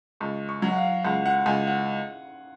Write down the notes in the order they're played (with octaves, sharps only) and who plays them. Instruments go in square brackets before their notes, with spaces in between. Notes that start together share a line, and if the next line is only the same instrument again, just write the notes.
[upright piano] C#2 [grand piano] C#6
[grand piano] C#6
[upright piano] F#3
[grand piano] F#5
F5
[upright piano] C#2 [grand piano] F#5
[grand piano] F#5
[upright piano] C#2 [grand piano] G#5
[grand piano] F#5